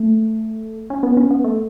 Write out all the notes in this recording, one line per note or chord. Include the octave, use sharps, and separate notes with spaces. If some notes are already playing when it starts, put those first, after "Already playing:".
Already playing: A3
C#4
B3
C#4
B3
A3